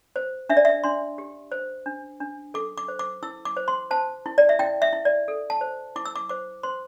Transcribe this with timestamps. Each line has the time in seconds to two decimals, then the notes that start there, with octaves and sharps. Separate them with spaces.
0.16 C5
0.49 D4 E5
0.57 D5
0.65 E5
0.84 D4 C6
1.18 G4
1.52 C5
1.86 D4
2.20 D4
2.54 A4 D6
2.78 D6
2.88 C5
2.99 D6
3.23 E4 E6
3.45 D6
3.57 C5
3.68 C6
3.91 C5 A5
4.26 E4
4.38 D5
4.49 E5
4.59 E4 G5
4.82 E5
4.93 E4
5.05 D5
5.28 A4
5.50 A5
5.61 C5
5.96 E4 D6
6.05 E6
6.16 D6
6.29 C5 D6
6.63 C5 C6